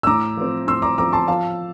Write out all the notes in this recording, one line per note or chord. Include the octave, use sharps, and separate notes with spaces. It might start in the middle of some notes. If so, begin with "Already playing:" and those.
E6
A2 A#5 D6
F3 C4
A2 C6 E6
A#5 D6
F3 C4 A#5 D6
A5 C6
F3 F5 A5